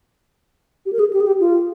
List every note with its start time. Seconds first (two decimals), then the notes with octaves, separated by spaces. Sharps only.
0.86 G4
0.93 A#4
0.99 G#4
1.13 G4
1.21 G#4
1.27 G4
1.40 F4